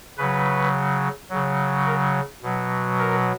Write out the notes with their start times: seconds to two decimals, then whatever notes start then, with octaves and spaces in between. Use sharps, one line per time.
0.18 C#3 F#3 B4
1.30 C#3 F#3
1.86 A#4
2.43 B2 F#3
2.99 A#4